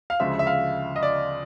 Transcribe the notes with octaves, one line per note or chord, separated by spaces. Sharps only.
F5
D2 C#3 F3 G#3 E5
E5
F5
D#5
D5